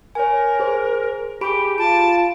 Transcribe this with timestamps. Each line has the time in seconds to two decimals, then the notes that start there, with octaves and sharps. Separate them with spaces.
0.15 A#4 C#5 G#5
0.60 G#4 C5
1.41 G4 G#4 B5 D7
1.78 F4 A5 D7